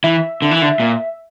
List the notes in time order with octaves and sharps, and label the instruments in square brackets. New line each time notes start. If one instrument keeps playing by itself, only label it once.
[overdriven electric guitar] E3 [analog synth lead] E5
[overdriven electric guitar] D3
E3
D3
A#2